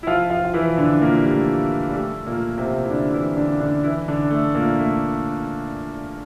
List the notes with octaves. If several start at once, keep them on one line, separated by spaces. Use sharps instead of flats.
E4
F3 F4
F3 F4
F4
E3 E4
D3 D4
A#2 A#3
G3
A3
G3
A3
A#2 A#3
C3 C4
E4
D3 D4
E3 E4
D3 D4
D3 D4
E3 E4
D3 D4
A3
A#2 A#3
A3